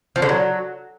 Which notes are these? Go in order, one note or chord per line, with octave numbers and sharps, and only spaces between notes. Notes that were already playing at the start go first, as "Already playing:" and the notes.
F3
D3
F#3